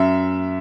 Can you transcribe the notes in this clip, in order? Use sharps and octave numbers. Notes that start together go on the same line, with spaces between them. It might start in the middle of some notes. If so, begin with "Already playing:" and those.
Already playing: F#2 E5